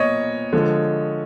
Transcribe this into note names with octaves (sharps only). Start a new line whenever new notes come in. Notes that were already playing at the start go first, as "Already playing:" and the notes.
Already playing: A#2 B3 C#5 D#5
D3 F3 G#3